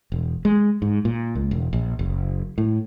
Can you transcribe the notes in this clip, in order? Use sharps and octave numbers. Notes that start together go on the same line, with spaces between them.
E1
G#3
G#2
A#2
C#2
E1
A#1
F#1
A2